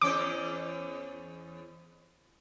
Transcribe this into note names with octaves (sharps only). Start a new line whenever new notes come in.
E2 C#4 C5 D6